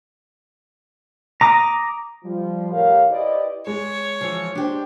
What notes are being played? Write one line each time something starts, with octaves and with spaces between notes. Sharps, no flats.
A#5 D6 D#6
F3 G3
A2 D#3 G4 A#4 C#5 F5
E4 G4 B4 C5 D5 D#5
G#3 C#5
E3 F3
D4 G4 C5